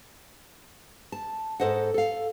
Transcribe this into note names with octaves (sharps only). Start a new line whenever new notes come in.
A5
G#2 A4 C5 D#5 F#5
A4 F5